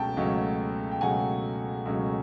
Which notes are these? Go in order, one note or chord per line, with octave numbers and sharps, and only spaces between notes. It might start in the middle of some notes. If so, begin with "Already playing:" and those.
Already playing: C#2 B2 F#3 A3 C#4 G5 A5
C#2 B2 F#3 A3 C#4
G5
C#2 B2 F#3 A3 C#4 F#5 G#5
C#2 B2 F#3 A3 C#4